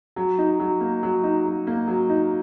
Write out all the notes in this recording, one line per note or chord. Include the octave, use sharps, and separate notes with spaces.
F#3
D#4
F#3
A#3
F#3
D#4
F#3
A#3
F#3
D#4